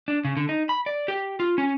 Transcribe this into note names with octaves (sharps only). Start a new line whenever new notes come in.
D4
C#3
D3
D#4
B5
D5
G4
F4
C#4